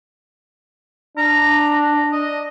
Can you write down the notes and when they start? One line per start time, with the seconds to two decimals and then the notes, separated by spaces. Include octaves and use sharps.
1.18 D4 A#5
2.12 D#5